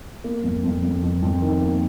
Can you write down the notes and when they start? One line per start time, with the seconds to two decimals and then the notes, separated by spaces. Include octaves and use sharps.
0.24 A#3
0.43 F2
0.64 F2
0.83 F2
1.03 F2
1.22 F2
1.42 D#3
1.61 A#3